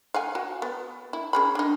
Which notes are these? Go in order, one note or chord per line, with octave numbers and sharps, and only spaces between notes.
F5 F#5 G#5
F#4
B3
E4
C#4 G#4 B5
D4 D#4